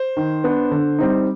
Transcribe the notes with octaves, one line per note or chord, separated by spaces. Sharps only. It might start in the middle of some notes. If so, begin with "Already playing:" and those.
Already playing: C5
D#3
B3 D4
D3
G3 C4 D#4